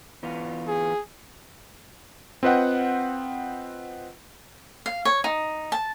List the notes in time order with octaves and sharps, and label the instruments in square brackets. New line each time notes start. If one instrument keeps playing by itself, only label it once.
[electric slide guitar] E3 B3 F4
[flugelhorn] G#4
[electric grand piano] C4 F4 B4 D#5 F#5 G5
[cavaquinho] F5
C#5
D#4
A5